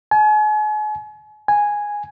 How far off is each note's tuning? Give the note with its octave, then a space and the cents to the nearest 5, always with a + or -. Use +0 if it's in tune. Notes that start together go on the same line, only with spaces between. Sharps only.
G#5 +40
G#5 -5